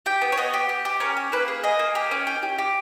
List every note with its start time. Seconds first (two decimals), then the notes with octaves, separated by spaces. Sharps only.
0.06 G4 G5
0.22 B3
0.32 C#5
0.37 B3 D#5
0.54 G4
0.69 G4
0.85 G4
1.00 C#4 A#4
1.17 G4
1.32 A#3 B4
1.48 G#4
1.64 G#4 D#5
1.79 A#3
1.95 G4
2.11 C#4
2.27 G4
2.43 G4
2.58 G4